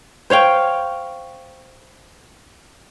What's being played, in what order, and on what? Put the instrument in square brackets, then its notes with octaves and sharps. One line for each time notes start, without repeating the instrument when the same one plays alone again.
[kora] C5 C#5 F5 G5